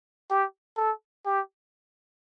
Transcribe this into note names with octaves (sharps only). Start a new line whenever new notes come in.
G4
A4
G4